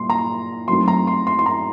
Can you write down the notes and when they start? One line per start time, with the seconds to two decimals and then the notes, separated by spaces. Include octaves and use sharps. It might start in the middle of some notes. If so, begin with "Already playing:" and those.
Already playing: A#2 G3 A#3 C6
0.10 A#5
0.68 F#2 F#3 A3 C4 D#4 C6
0.88 A#5
1.07 C6
1.27 C6
1.39 C6
1.46 A#5